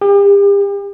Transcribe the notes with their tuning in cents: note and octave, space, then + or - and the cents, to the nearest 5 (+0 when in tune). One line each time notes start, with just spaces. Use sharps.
G4 +40